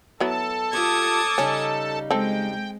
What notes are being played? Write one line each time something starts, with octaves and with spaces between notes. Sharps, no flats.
F#3 B3 E4 A4 A5
F4 G4 D6 D#6 G#6
C#3 G3 C#4 D#4
G#3 C4 A4 G5